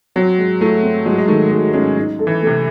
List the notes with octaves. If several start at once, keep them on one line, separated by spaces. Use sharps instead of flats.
F#3 C4
G#3
A3 E4
C4
F#3 G#3
G#3
D#3 A3
A3 G#4
G#3 C#4
D#4
A4
E3
C3 A3